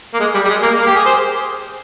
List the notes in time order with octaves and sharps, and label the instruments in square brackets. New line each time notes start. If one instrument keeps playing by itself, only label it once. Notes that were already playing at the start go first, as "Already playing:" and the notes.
[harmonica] A#3
G#3
G3
G3
G#3
A#3
A#3
G4
G#4
C5